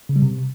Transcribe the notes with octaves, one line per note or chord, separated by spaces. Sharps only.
C#3
G3
C3